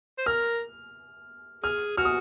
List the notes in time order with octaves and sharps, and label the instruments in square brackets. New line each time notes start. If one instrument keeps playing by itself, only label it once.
[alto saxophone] C5
[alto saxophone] A#4 [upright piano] F6
[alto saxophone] G#4 [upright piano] F6
[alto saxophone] F#4 [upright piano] F6
[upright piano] D#6